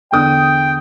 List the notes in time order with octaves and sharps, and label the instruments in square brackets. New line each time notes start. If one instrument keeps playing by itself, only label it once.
[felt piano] E2 D3 D#6 [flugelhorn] G5